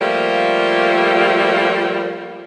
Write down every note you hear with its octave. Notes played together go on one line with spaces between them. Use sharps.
F3 G3 A3 A#3 F4